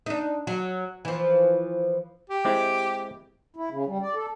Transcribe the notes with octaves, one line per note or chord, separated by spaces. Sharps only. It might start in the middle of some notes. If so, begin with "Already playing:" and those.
D4 D#4
F#3
E3 F3
G4
G#3 C4 E4 D6
E4
C#3
G3
D5
A4